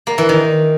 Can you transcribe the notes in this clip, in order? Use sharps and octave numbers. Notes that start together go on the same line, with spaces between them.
A#3
E3
D#3